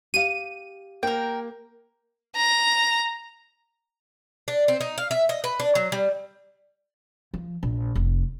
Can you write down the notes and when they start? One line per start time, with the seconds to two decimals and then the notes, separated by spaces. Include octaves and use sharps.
0.14 G4 F5 D#7
1.03 A#3 A#4 G5
2.36 A#5
4.48 D4
4.68 C4
4.81 D#4
4.98 F5
5.11 E5
5.29 D#5
5.44 B4
5.60 D4
5.75 F#3
5.92 G3
7.34 F3
7.63 A#1
7.95 F1